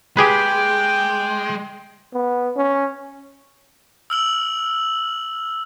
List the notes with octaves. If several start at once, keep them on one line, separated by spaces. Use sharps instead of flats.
G#3 G4 G#4 B4 G5 D6
B3
C#4
E6 F6 F#7